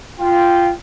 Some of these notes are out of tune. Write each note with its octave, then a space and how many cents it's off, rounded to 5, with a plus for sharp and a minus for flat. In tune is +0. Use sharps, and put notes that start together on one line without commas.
F4 -15 G5 +0